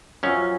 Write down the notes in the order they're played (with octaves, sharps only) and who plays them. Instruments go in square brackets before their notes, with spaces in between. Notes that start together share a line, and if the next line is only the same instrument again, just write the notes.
[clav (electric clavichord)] F#2 F3 C#4